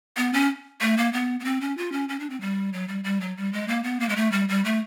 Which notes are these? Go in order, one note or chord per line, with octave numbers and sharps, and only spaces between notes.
B3
C#4
A3
A#3
B3
B3
C4
C#4
F4
C#4
C#4
D4
C4
G3
F#3
G3
G3
F#3
G3
G#3
A#3
B3
A#3
G#3
A3
G3
G3
A3